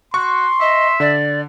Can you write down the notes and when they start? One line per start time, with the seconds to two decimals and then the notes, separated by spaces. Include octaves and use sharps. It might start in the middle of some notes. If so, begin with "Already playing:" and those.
0.14 F#4 C6 C#6
0.60 D#5 E5
1.00 D3 D5